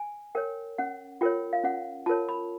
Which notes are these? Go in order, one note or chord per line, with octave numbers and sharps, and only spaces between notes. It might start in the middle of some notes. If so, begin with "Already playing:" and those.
Already playing: G#5
A#4 C#5 G5
C#4 F#5
F4 A#4 C#5 G5
F5
C#4 F#5
F4 A#4 C#5 A5
B5